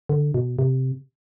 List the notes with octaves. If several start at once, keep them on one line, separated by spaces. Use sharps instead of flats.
D3
B2
C3